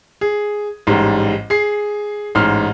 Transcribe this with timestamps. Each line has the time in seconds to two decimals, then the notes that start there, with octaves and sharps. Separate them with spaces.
0.21 G#4
0.87 A1 G#2 G3
1.50 G#4 C7
2.35 A1 G#2 F6